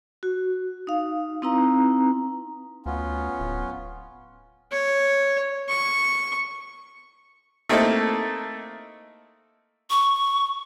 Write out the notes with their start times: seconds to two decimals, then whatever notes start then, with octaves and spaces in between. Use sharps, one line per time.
0.23 F#4
0.87 D#4 F5
1.42 C4 D#4 E4 B4 A#5
2.86 D2 B3 C#4 F4
3.40 D1
4.72 C#5
5.68 C#6
7.69 A3 A#3 C4 D#4 E4 A4
9.90 C#6